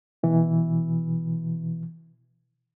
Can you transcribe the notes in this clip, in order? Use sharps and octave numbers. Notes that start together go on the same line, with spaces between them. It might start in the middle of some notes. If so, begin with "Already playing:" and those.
B2 E3